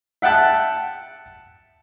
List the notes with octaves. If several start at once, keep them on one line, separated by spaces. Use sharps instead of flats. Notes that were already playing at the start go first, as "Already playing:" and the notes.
E5 F#5 G5 A5 F#6